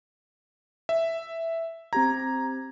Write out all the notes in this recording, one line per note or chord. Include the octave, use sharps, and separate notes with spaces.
E5
C4 G4 A#5 G#6